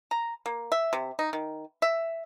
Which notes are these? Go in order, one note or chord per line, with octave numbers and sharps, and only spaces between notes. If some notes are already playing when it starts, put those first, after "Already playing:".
A#5
A#3
E5
C3
D#4
D#3
E5